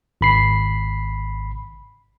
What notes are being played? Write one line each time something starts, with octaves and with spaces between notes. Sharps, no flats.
G#1 B5 C7